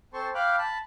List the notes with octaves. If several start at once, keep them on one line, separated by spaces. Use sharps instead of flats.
C4 A4 C5 A5 C6 C#6
F5 G5 B5 D6 F6 F#6
A5 B5